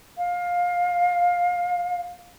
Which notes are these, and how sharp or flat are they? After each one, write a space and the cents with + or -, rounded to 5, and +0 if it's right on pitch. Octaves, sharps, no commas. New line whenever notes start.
F5 +20